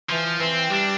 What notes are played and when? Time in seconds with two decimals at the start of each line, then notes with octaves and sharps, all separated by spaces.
0.10 E3 F3
0.39 E3 C4
0.70 G3 D4